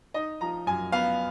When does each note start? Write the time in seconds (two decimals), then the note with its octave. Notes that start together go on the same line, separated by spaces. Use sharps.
0.14 D#4 D#5
0.41 F3 A#5
0.67 F#2 G#5
0.92 B3 F5